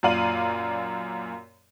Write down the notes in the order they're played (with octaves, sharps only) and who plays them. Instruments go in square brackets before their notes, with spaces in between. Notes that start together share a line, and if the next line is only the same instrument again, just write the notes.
[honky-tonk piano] F#2 A#2 D5 F5 D#7 F#7